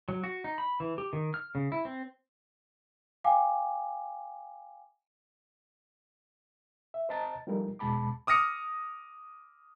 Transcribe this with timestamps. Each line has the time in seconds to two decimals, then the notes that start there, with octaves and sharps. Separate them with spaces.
0.09 F#3
0.24 F#4
0.44 D#4
0.58 B5
0.80 E3
0.98 G4
1.13 D#3
1.34 F6
1.55 C#3
1.72 E4
1.85 C4
3.24 F5 G5 G#5 D6
6.94 E5
7.09 C5 D#5 A5 A#5 A6
7.47 F3 G3 A3 D#4 A#4
7.79 E2 B2 G#3 A5 B5 D6
8.27 D6 D#6 F6 A#6 C#7